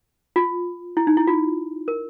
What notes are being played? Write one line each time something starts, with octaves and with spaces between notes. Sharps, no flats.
F4
E4
D#4
E4
F4
A#4